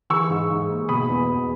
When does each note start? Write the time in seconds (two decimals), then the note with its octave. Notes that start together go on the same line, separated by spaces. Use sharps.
0.10 E3 C#6 E6
0.30 G#2
0.50 G#2
0.70 A#3
0.89 B2 B5 D#6
1.10 E2
1.28 E2